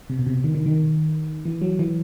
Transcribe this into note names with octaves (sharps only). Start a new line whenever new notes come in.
C3
B2
C3
D#3
D#3
D#3
E3
F#3
E3